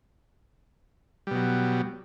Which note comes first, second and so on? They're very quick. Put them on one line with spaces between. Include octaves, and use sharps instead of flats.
G3 B2 F#3